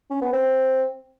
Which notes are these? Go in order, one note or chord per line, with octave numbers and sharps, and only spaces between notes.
C#4
B3
C4